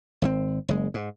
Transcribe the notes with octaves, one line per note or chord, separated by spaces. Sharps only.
G#1 D#3 C4
F#1 G#3
G#2